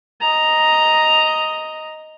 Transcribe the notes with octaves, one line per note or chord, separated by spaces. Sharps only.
D#5 A#5